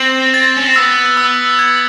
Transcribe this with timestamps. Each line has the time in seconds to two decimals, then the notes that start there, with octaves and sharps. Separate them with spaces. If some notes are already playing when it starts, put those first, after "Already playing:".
Already playing: C4 F#7
0.34 A6
0.56 C#4
0.66 C4
0.76 B3 E6
1.17 E6
1.59 G#6